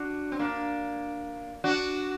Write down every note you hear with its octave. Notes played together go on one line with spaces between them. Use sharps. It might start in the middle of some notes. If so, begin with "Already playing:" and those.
Already playing: D4 F#4
C4
A#3 D4
D4 F#4